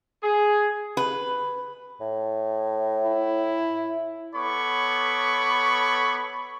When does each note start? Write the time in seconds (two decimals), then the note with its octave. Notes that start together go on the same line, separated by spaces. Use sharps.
0.23 G#4
0.97 B4
2.00 A2
3.04 E4
4.35 B3 A4 C#5 B5 C#6 D6